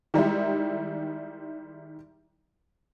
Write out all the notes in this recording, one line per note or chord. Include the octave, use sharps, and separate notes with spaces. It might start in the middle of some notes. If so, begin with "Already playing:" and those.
D#3 G3 G#3 E4